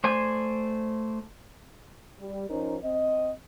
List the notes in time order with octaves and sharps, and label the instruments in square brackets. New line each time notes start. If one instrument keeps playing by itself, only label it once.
[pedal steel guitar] A3 C5 D5 G#5
[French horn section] G3
F3 C#4 D#4 A#4 C5
C4 D#5